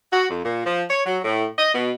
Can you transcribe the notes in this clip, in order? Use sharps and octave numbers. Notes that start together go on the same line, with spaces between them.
F#4
F2
A#2
F3
C#5
F#3
A2
D#5
B2